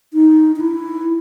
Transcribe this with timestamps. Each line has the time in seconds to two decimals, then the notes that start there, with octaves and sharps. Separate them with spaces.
0.13 D#4
0.56 D#4
0.60 E4